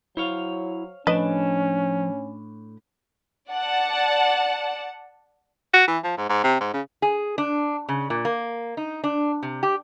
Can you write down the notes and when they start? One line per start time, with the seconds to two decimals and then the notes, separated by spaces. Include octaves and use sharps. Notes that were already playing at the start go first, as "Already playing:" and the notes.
0.17 F#3 E4 C5 C#5 F5
1.07 A2 F3 C#4 D4 B4 D#5 A5
3.50 D5 F#5 A5
5.73 F#4
5.88 E3
6.04 F3
6.17 G#2
6.29 G#2
6.43 C3
6.60 G#2
6.73 C#3
7.02 G#4
7.38 D4
7.89 C#3
8.10 A#2
8.25 A#3
8.77 D#4
9.04 D4
9.43 C3
9.63 G4